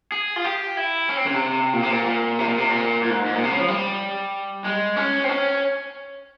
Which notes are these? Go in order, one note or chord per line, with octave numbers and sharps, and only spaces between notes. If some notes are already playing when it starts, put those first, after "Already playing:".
G#4
F4
G4
E4
C#4
C4
C#3
C3
A#2
C3
A#2
A#2
C3
A#2
C3
A#2
A#2
G#2
G#2
A#2
C3
C#3
F3
G3
G#3
C#4
C4
C#4